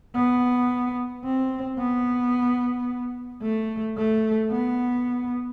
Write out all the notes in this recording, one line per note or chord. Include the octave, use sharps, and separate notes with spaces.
B3
C4
B3
A3
A3
B3